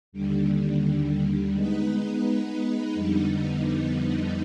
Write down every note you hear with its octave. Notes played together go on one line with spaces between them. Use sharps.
D#2 D3 G3
G#3 B3 D#4 B4
F2 D3 G3 B3 D#4